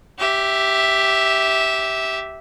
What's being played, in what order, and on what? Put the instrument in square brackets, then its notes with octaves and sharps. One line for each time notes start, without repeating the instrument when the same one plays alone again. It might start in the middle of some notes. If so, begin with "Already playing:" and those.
[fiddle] G4 E5